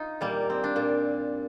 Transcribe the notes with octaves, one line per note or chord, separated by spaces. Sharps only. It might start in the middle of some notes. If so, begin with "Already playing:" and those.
Already playing: D#4 F4
A#2 G3 A#3
C4
D4
A#2